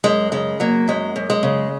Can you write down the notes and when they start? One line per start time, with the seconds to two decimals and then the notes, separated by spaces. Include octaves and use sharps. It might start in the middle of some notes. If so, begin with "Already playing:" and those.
0.04 F#2 G#3
0.32 C#3 G#3
0.60 F#3 A#3
0.88 F#2 G#3
1.16 F#2
1.30 G#3
1.43 C#3